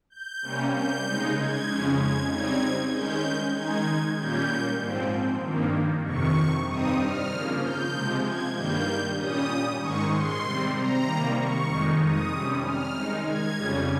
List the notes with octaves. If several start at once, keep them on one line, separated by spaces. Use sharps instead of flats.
G6
C3 G3 A#3 C#4
G6
C#3 G#3 D#4
G#6
F2 C#3 G#3 C#4
G#6
C#3 G3 C4 D#4 G#6
D#3 G#3 C#4 G6
D#3 G#3 D#4 G#6
A#2 G3 A#3 C#4 G6
G#2 F3 C4
G2 D#3 A#3
F2 C3 D#3 C#6
G2 G3 C4 D#4 D#6
F6
C#3 F3 A#3
G6
C3 F3 G#3
G#6
G2 D#3 G3 A#3 G6
A#2 G3 C#4 D#6
G#2 D#3 G#3 C#6
C6
C3 G3 C4
A#5
C3 D#3 G3 A#3
C#6
F2 D#3 G#3 D#4
D#6
C3 G3 C#4
F6
D#3 G#3 D#4
G#6
F2 C#3 G3 C#4